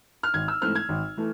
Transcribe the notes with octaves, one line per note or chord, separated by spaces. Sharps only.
F6
G#1 G#6
E6
G#2 E3 A3 C4 F6
G#6
G#1
E3 A3